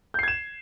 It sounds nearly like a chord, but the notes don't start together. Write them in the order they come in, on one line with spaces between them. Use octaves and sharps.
G6 C7 G#6 E7